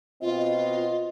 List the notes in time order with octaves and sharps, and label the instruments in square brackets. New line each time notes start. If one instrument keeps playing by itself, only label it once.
[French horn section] B2 C4 D#5 [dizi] F4